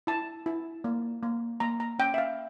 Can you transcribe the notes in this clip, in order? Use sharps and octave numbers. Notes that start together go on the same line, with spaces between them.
E4 A5
E4
A#3
A#3
A#3 A#5
A#5
C#4 G5
E5
F5